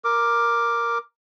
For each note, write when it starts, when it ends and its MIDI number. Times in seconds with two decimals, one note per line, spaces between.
0.04 0.98 70
0.04 0.98 86